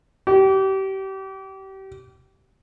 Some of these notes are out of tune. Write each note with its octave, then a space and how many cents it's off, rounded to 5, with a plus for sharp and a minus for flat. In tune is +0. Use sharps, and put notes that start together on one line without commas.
G4 -30